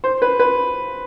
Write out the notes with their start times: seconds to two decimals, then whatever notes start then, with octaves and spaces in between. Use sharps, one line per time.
0.04 C5
0.22 B4
0.39 B4